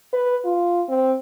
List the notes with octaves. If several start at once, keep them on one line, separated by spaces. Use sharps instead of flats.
B4
F4
C4